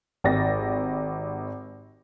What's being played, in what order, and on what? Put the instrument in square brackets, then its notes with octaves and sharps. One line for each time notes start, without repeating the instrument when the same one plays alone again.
[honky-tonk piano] G#1 G4 A6 A#6